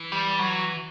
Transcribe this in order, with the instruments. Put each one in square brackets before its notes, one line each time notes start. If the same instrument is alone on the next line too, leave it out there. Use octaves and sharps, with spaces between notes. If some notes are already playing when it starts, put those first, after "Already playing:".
Already playing: [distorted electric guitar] E3
[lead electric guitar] G3
F#3